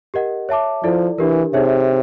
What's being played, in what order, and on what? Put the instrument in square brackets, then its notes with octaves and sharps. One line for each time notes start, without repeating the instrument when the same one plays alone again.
[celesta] G4 A#4 D#5 F#5
C#5 E5 A5 D6
[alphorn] F3 [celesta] E4 A4 D5
[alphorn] E3 [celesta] D4 G4 A#4
[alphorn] C3 [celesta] D#4 G#4 C#5 E5